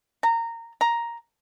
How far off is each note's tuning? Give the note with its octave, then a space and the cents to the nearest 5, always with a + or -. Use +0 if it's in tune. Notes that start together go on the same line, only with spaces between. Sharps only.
A#5 -20
A#5 +5